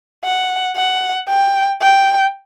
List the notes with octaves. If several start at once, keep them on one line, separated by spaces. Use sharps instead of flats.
F#5
F#5
G5
G5